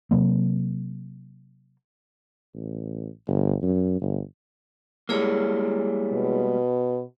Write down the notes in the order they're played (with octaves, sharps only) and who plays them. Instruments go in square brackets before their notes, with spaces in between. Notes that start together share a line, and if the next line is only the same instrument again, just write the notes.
[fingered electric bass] C3 F#3 A#3
[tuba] A1
G1
F#2
G1
[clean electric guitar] G3 G#3 A#3 [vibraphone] E4 G#4 C#5
[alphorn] B2